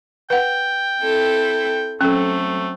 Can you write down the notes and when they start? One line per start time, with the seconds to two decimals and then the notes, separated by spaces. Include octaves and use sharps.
0.30 B4 F#5 G5
1.01 C4 E4 A4
2.01 F#3 A3 C4 C#4 A4